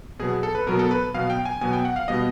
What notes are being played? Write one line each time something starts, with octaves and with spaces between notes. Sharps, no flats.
B2 F#3 B3 G#4
A4
B4
B2 F#3 B3 A#4
A4
B4
B2 F#3 B3 F5
G5
G#5
B2 F#3 B3 G#5
G5
F#5
F5
B2 G3 B3 D#5